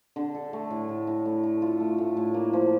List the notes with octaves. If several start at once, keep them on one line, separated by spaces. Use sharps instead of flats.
D3
A4
A3
A2
A2
A2
A3
A3
F4
A3
A3
A2
A#3
F3